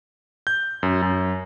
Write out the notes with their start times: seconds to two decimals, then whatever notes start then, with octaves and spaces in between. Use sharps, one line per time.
0.47 G6
0.83 F#2
1.02 F#2